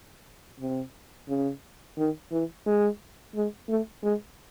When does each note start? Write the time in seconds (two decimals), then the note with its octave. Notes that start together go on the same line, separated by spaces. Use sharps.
0.60 C3
1.28 C#3
1.98 D#3
2.32 E3
2.66 G#3
3.35 G#3
3.69 A3
4.03 G#3